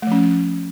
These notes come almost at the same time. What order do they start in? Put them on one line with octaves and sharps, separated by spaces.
A3 F3 C#4